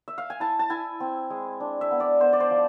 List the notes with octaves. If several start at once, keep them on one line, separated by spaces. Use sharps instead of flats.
E5
F5
G#5
E4 A5
A5
E4 G#5
C4
G#3
D4
E5
B3
D5
B3 C5
D5
C5
F3